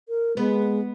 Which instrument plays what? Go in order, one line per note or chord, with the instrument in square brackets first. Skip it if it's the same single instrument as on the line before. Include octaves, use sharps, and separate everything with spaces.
[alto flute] A#4
[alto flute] G#3 [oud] B3